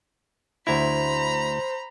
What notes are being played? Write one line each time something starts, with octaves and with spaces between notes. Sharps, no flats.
D2 E4 C5 A#5 B5